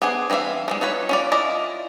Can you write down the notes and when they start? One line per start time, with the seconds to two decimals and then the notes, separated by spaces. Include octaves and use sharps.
0.02 B3 D4 G#4 C5
0.30 E3 C4 F#4 E5 F5
0.68 F3 G3 G#3
0.81 D#4 F4 B4 C#5
1.09 C#4 F4 D5
1.32 E4 F4 D5 D#5